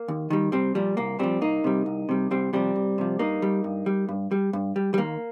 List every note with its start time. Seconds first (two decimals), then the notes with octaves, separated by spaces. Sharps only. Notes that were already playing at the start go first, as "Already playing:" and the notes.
Already playing: A#3
0.08 D#2
0.30 D#3 G3
0.52 C2 G3 C4
0.75 A#2 F3 G3
0.97 C2 A#3
1.19 A#2 F3 G3 C4
1.41 C2 A#3 D#4
1.64 C3 G3
1.86 C2
2.09 C3 G3
2.31 C2 G3 C4
2.53 C3 F3 G3 C4
2.76 C2
2.98 C3 F3
3.19 G2 A#3 D#4
3.42 G3
3.64 G2
3.86 G3
4.09 G2
4.31 G3
4.53 G2
4.76 G3
4.94 G3
4.98 D#2 A#3